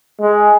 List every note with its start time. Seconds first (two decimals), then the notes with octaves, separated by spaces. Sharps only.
0.20 G#3